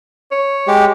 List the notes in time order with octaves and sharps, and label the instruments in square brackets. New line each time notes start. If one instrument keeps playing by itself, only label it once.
[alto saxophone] C#5
[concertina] G#3 G4